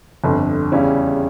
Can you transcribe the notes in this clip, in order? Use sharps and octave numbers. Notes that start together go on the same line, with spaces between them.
G1 F2 D3
E2 C#3 G3 C#4 E4